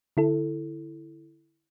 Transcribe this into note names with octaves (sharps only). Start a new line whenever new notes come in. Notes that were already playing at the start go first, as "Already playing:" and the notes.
D3 E4 A4